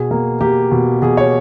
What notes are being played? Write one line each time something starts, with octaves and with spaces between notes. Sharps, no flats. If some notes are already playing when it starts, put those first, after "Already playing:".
Already playing: B2 G#4
A#3
A#3 G4
B2
B2 G#4
C#5